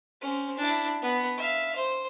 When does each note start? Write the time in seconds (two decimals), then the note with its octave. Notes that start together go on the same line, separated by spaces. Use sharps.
0.21 C4 C#4
0.57 D4 E4
1.02 B3
1.38 E5 F5
1.76 C5